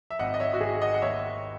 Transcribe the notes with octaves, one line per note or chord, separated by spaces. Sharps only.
E5
G#1 D#5 F#5
D#5
C#5 E5
F#4
G#1 G#4
D#5 F#5
F#5
D#2 C#5 E5